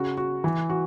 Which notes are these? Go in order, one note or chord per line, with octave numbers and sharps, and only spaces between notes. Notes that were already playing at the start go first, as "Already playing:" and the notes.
Already playing: C#3 F#4
F#4
E3
F#4